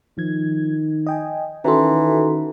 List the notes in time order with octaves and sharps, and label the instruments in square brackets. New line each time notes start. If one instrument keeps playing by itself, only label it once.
[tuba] D#3 [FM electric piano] F3 G#6
[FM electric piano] D#5 G5 G#5
[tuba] D#3 [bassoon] E3 [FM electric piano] C#4 F#4 A4 [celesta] A#5 C6